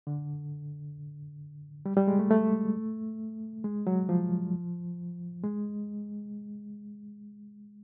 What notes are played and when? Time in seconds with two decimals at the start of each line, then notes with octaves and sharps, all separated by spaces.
0.07 D3
1.86 G3
1.97 G3
2.08 G#3
2.19 A3
2.31 A3
3.64 G#3
3.87 F#3
4.09 F3
5.43 G#3